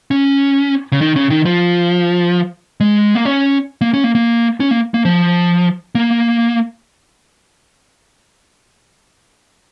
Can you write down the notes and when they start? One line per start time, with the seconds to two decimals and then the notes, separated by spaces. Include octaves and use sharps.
0.11 C#4
0.92 C#3
1.01 D#3
1.16 C#3
1.30 D#3
1.45 F3
2.80 G#3
3.15 A#3
3.25 C#4
3.81 A#3
3.94 C#4
4.04 A#3
4.15 A#3
4.60 C#4
4.71 A#3
4.94 A#3
5.05 F3
5.95 A#3